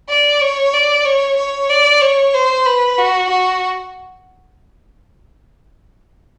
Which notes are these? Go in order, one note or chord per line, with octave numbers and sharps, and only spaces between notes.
D5
C#5
D5
C#5
C#5
D5
C#5
C5
B4
F#4
F#4